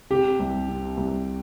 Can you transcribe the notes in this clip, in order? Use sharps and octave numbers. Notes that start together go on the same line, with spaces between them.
C3 G4
C2
C3
C2